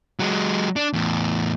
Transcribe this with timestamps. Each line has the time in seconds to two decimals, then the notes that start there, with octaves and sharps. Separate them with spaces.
0.20 F#3 G#3
0.76 D4
0.93 E2 A2